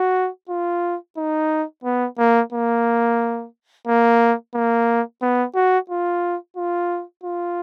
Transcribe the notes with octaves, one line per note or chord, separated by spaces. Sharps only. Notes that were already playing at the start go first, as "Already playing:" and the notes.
Already playing: F#4
F4
D#4
B3
A#3
A#3
A#3
A#3
B3
F#4
F4
F4
F4